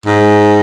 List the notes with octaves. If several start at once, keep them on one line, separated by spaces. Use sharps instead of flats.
G#2